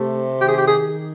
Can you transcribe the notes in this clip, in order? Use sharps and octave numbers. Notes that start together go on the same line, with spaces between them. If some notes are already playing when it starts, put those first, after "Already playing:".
Already playing: C3 A3
D#3 G4
G#4
G4
G#4